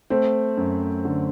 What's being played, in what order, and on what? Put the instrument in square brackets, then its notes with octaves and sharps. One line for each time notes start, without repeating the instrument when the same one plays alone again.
[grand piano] A3 [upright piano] C4
[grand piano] F#2
D3